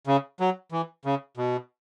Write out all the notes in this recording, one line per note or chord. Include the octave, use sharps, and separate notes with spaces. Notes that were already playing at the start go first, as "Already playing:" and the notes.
C#3
F#3
E3
C#3
B2